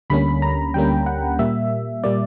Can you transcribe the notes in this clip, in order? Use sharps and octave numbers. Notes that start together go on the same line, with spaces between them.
D2 D3 G3 A#3 C#4 B5
A#5
D2 D3 G3 A#3 C#4 G5
F#5
A#2 G3 A#3 E5
A#2 G3 A#3 D5